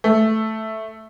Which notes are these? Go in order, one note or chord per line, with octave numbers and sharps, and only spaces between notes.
A3